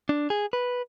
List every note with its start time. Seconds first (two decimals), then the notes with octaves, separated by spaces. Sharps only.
0.09 D4
0.30 G#4
0.53 B4